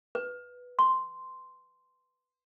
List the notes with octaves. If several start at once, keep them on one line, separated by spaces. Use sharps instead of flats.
B4
C6